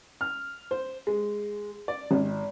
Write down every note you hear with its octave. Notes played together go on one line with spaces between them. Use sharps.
F6
C5
G#3
D5
G#1